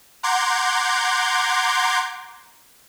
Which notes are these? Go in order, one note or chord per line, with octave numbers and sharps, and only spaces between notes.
F#5 A#5 C6 D6 G6 G#6